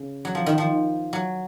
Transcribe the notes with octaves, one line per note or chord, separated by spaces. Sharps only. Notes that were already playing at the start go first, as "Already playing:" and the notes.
Already playing: C#3
F#3
F3
D#3
F3
F#3